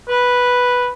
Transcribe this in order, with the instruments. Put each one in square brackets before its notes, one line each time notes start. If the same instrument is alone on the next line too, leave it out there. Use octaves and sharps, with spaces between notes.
[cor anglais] B4